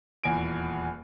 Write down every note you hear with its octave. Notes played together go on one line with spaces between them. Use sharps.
D#1 E2 G#5 D7